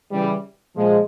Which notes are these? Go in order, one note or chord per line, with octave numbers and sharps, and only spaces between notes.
C#3 E3 G3
A#2 F3 G#3